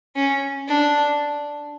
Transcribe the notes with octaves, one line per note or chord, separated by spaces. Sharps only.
C#4
D4